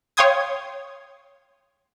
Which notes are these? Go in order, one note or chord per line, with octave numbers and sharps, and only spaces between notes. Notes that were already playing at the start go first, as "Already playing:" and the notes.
C#5 F5 G5 C6 D#6 G#6